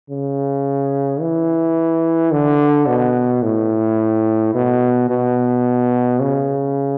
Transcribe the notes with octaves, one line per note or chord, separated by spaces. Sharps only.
C#3
E3
D3
B2
A2
B2
B2
C#3